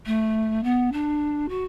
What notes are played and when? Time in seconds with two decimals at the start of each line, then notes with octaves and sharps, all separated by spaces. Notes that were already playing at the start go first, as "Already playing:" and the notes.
0.06 A3
0.64 B3
0.92 D4
1.49 F#4